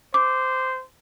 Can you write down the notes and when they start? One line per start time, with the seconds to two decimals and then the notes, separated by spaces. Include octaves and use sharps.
0.14 C5 D6